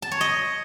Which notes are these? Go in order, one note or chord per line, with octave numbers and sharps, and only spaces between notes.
A5
C#5
D#5